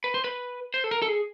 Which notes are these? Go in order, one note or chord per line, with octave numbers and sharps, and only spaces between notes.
B4
C5
B4
C5
A4
A#4
A4
G#4